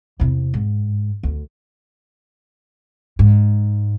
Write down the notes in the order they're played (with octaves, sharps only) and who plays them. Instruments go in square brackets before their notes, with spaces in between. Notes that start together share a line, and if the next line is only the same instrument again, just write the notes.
[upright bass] E2 C3
G#2
D2
G#2